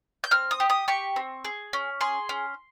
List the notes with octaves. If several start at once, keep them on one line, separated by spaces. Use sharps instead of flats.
G6
C4 F6
D#6
G4
D#6
G4 C#6
C4
G#4
C#4
G#4 C6
C#4